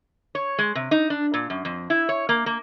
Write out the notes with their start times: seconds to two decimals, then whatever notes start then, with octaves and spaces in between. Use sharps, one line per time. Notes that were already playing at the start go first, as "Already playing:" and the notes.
0.35 C#5
0.58 G#3
0.75 C3
0.91 D#4
1.10 D4
1.34 A#2
1.50 F#2
1.65 F2
1.90 E4
2.09 C#5
2.29 A#3
2.46 A#3